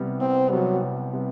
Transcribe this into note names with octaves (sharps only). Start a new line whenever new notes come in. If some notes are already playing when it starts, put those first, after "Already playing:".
Already playing: C2 C3 G3 B3
C2 C4
C3 F#3 G3 B3
C2
C3 G3 B3